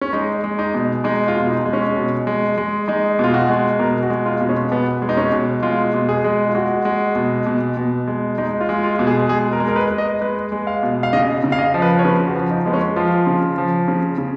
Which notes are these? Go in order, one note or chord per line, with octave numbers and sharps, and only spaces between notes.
C#4
G#3 D#4
G#3
D#4
B2
G#3 D#4
F4
B2
D#4
G#3
C#4
B2
G#3
G#3
G#3 D#4
B2 F4
F#4
G#3
B2 A#4
F#4
G#3
F4
B2
C#4
B2 B3
G#3
D#4
C#4
B2
G#3 F4
B2
G#4
G#3
F4
G#3 F#4
G#3
B2
B2
B2
G#3
G#3 D#4
F4
G#3
F4
B2
G#4
G#3 G#4
A#4
G#3
A#4
B4
G#3
D#5
G#3 B4
G#3
F5
B2
F5
C#3 D#5
C#3
F5
D#5
F3
B4
C#5
C#3 B4
F#4
F3
D#4
G#3 B3
C#4
F3 F4
C#3
F3
C#3
C#3